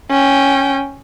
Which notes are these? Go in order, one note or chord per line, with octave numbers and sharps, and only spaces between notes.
C#4 G5